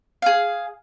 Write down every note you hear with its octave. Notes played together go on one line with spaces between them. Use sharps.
G#4 F5